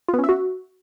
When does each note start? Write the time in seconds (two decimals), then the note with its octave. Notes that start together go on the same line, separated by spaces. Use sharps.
0.08 F4
0.13 B3
0.19 C#4
0.24 E5
0.29 F#4